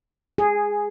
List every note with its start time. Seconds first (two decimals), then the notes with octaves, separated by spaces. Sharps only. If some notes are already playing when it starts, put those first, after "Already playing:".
0.38 G#4